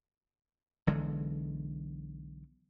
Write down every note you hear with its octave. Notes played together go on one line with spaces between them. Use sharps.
B1 D3 E3 G#3